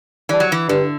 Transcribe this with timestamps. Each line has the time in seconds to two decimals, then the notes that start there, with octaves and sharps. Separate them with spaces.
0.29 E3 G3 D4
0.40 F#3
0.52 E3
0.68 G2 D3